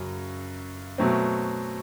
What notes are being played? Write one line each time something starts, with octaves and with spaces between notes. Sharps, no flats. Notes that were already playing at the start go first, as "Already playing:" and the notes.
Already playing: F#2 C#3 F#3 C#4
B2 F#3 A3 C4